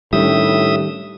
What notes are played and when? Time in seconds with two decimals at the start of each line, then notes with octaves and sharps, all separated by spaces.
0.13 A2 D#3 G3 C#4 D4 G4 E5 D#6